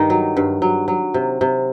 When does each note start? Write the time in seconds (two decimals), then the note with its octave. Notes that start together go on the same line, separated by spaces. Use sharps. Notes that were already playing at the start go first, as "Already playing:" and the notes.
Already playing: G2 D#3 D#4
0.10 F#3
0.37 G2
0.62 F#3
0.88 F#3
1.14 C3
1.41 C3